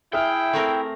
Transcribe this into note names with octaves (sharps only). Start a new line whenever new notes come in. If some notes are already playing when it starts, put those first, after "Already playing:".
E4 G#4 E5 G5 F6
A3 C4 A#4